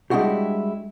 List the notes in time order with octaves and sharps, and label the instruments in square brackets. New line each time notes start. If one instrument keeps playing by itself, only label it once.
[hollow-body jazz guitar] G3 G#3 D4 E4 F#4 G4